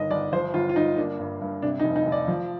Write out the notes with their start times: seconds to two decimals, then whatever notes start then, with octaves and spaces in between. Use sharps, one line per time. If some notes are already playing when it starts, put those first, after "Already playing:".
Already playing: G1 D#3 D#5
0.11 G1 D5
0.33 F3 C5
0.54 G1 F4
0.69 F4
0.76 G1 D#4
0.97 A#3 D4
1.19 G2
1.42 G2
1.62 C3 D4
1.79 D#4
1.84 F1
1.96 D#4
2.06 F1
2.12 D5
2.28 F3